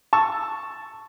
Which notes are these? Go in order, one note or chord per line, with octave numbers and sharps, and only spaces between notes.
A5 C#6 E6